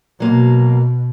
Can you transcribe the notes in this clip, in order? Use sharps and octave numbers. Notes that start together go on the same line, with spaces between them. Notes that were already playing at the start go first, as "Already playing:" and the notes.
B2 F#3 A#3